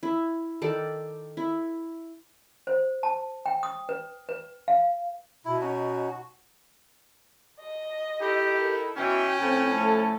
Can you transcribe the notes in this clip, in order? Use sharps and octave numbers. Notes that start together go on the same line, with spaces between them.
E4
D#3 A4 D5
E4
C5
A5
G5
D#6
B4
B4
F5
B2 E4
C#4 D#4 F#4
F#4
D#5
D#4 E4 G4 A4
A#4
B2 E3 C#4 F#4 G5
A2 F3 C4
A3 A4